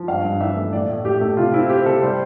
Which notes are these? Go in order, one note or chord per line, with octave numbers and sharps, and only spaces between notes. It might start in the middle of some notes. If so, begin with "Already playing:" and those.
Already playing: F3
G2 F5
G2
E3 E5
A3
A2 D5
A2
A2 G4
A3
C3 F4
C4 E4
C4 G4
C3 A4
G3 C5